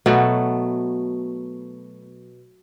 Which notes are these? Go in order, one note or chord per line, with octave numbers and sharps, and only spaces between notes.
B2 F#3 A3 B3